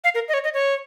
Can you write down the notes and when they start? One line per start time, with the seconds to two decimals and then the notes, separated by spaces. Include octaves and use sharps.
0.04 F5
0.15 A#4
0.28 D#5
0.34 C#5
0.44 D#5
0.54 C#5